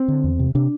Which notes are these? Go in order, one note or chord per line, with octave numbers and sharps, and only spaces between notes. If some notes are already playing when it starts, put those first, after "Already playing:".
Already playing: C4
D3
E2
C3
C3 D4